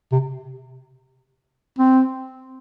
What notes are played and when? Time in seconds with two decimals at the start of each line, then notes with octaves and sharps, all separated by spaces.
0.12 C3
1.79 C4